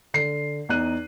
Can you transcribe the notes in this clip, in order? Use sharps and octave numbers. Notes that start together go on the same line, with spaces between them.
D3 C7
E2 D#4 F#6 D#7